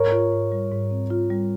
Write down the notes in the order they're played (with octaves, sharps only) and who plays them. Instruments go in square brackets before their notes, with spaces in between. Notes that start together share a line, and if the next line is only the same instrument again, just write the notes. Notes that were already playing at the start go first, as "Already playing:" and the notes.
Already playing: [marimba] G#2 [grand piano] A#4 C#5
[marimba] F4
G#2
G3
G#2
C4
F4
G3